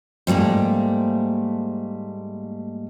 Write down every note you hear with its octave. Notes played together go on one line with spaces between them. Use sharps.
G#2 G3 A3 A#3